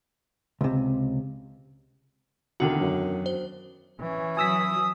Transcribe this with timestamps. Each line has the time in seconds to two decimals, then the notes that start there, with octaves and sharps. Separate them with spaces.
0.61 C#2 C3
2.60 E2 D3 D#3 F#4
2.80 F#2
3.26 C5
4.00 E3 C#4
4.37 F#3 G#5 D#6 E6 B6